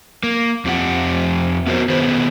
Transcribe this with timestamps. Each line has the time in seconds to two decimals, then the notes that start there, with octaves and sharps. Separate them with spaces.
0.23 A#3
0.65 F2 C4 G4 F#5
1.67 B3 F#4 A#4 C5
1.89 D#3 B3 G#4 B4 C5